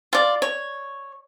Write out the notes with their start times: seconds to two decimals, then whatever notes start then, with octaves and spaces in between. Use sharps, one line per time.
0.13 F4 D5
0.42 C#5